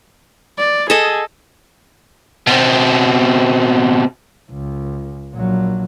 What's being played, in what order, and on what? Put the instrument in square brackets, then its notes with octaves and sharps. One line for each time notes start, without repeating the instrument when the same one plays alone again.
[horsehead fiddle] D5
[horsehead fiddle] G#4 [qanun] A4 D#5
[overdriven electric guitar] B2 C4
[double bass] C#2
A#1 F#3